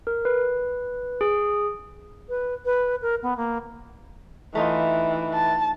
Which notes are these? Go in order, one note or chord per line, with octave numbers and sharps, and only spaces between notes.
A#4
B4
G#4
B4
B4
A#4
B3
A#3
E3 A3 D#4 F4
A5